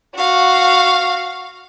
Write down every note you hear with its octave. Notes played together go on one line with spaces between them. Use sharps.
F#4 F5